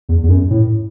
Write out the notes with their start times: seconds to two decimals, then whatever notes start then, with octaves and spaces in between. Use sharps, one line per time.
0.09 E2
0.23 E2
0.29 F#2
0.50 A2